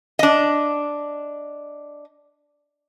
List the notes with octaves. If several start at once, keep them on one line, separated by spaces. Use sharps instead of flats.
D4 D#5